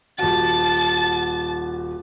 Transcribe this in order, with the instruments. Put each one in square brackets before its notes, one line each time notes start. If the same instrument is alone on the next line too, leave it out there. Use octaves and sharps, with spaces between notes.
[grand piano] D#1 F#4 [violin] A5 A6